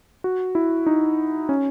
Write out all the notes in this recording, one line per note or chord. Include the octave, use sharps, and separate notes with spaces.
F#4
E4
D#4
C#4